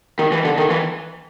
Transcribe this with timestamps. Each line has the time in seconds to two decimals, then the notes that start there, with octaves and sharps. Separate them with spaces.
0.19 D#3
0.32 E3
0.45 D3
0.58 D#3
0.71 E3